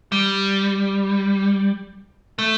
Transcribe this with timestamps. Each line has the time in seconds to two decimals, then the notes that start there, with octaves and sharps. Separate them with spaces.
0.12 G3
2.39 A3